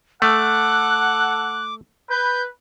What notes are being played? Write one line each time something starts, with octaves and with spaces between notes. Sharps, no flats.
A3 A4 F#5 D6 F#6
B4 G6